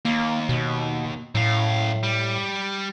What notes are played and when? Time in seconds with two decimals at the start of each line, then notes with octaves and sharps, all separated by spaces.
0.05 D#2 A#3
0.49 B2
1.35 F#2 A2 F5
2.03 G3